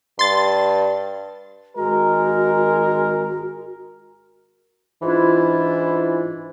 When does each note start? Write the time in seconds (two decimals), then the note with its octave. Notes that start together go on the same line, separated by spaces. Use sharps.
0.19 G2 C6 A6
1.77 G#1 G#3 F#4 A#4
5.02 G#2 E3 D4 E4 F4